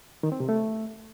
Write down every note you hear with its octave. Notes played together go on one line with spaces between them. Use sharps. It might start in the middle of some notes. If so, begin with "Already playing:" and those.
D#3
C4
C3
A3